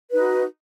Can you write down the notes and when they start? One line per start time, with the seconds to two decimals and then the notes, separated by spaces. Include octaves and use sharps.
0.10 B4
0.13 D#4
0.16 F#4